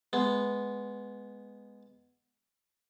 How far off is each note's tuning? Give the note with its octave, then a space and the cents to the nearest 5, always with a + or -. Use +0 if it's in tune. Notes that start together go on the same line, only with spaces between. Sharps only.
G#3 +0 B3 +0